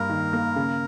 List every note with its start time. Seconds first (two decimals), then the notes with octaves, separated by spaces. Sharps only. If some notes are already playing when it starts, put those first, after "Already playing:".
Already playing: G2 A#3 A#4
0.10 D#3
0.33 A#3
0.56 C#3